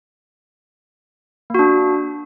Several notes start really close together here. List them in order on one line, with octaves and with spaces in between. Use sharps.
A#3 F#4 D4